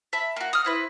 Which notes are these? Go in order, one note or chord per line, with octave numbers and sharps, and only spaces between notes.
E5 A5 B5
A#3 F#4
D#6 F6
C4 E4 B4